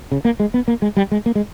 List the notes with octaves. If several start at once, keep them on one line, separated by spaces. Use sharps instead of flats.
C#3
A#3
G#3
B3
A#3
G#3
G3
G#3
A#3
G#3